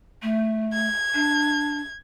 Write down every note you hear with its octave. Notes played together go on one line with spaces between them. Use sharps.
A3
G#6
D4